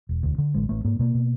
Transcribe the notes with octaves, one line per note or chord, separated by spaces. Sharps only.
E1
D2
D3
A1 G#3
A1 A3
G#2 A#3
B2 A#3
B2